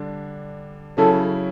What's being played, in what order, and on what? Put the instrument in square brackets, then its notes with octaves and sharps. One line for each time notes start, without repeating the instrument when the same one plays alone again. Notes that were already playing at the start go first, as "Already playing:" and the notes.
Already playing: [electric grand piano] D3 G3 D4
[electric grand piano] C#3 F#3 C#4 E4 [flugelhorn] A4